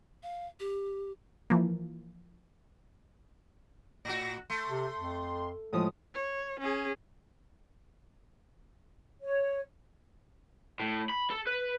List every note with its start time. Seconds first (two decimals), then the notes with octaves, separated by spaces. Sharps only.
0.23 F5
0.60 G4
1.50 E3 F3 A#3
4.05 A2 F#4 A#6
4.50 A3 C6
4.69 C3
4.95 F2
5.73 A2 F3 G#3 D#6
6.15 C#5
6.60 C#4 G#4
9.22 C#5
10.80 A2
11.10 B5
11.30 A4
11.47 B4